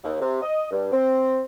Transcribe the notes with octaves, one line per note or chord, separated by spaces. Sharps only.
D#2
C3
D#5
G2
C4